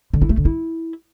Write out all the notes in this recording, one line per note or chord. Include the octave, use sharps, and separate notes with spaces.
D3
E4
A3
D3
E4